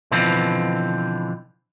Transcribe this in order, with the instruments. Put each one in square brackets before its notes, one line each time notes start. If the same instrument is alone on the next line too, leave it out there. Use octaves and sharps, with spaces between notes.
[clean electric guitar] B2 D3 E3 F3 C4